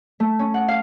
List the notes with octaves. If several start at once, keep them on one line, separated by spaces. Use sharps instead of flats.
A3
C#4
F#5
F5